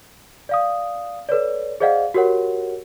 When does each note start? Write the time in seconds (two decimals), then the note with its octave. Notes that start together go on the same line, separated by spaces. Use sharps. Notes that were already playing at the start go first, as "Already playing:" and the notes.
0.49 D5 F5 D#6
1.29 A4 B4 C#5 D5
1.80 G#4 C5 D5 D#5 F5 F#5
2.14 F#4 G4 A#4 C#5 F#5